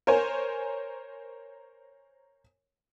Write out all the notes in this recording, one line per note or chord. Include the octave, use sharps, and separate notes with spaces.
A#4 C5 C#5 G#5